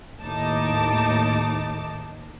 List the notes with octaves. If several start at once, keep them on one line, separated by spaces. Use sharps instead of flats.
D#2 A2 D#4 A5 D6